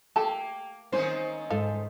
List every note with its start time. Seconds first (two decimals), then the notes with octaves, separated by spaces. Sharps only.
0.16 A3 A#3 G4 A4 A5
0.92 D#3 A#3 C4 C#4 D#4 C5
1.50 G#2 A4 F5